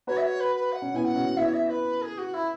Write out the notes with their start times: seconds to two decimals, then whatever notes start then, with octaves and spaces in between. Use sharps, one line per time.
0.07 F#4 B4 C#5
0.17 E5
0.24 C#5
0.40 B4
0.55 B4
0.72 F#5
0.82 C#4
0.94 B3 E4 G#5
1.04 F#5
1.15 C#4 F#4
1.36 B3 E4 E5
1.45 C#5
1.53 E5
1.70 B4
2.02 G#4
2.18 F#4
2.33 E4